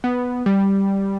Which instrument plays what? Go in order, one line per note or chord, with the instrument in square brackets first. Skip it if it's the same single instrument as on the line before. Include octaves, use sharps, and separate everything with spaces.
[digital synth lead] B3
G3